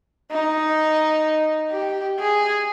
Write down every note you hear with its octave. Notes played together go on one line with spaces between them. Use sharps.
D#4
G4
G#4